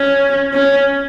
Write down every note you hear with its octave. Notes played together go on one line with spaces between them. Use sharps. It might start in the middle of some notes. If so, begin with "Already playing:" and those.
Already playing: C#4
C#4